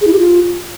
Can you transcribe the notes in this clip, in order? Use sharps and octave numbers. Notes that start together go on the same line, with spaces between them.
G#4
E4
G4
F4